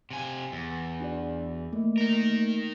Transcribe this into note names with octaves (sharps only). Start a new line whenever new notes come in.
C3 G#5
E2
D4 F#4 D5
A3 A#3
D#4 A#4